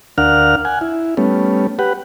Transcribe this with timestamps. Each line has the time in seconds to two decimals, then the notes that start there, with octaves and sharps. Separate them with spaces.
0.18 D2 D4 A#4 F5 F#5 F6
0.65 F#5 G#5
0.81 E4
1.17 G3 A3 B3 C#4
1.79 G4 B4 F#5